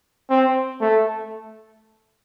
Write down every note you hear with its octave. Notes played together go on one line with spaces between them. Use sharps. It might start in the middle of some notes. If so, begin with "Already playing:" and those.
C4
A3